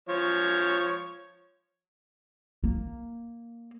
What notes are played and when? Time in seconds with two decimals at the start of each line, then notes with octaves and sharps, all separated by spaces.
0.09 F3 C#5
2.64 A#3